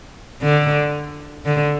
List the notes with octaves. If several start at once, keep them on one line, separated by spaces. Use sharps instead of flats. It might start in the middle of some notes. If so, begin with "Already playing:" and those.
D3
D3